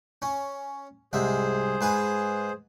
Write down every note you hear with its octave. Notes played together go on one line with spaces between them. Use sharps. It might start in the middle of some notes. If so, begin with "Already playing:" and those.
C#4
C2 G#2 G#4 C5 E5
G#2 B4 G#5